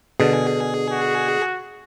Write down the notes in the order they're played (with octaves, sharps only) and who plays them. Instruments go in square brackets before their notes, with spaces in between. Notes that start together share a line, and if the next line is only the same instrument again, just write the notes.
[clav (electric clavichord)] B2 D3 [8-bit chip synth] G#4
[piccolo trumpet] F#4